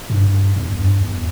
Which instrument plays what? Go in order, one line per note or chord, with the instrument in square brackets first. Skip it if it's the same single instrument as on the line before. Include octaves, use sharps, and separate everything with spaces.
[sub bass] G2
E2
G2
E2